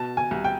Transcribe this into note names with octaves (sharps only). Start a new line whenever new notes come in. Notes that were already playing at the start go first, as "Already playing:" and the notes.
Already playing: B2 A5
G#5
C2
G5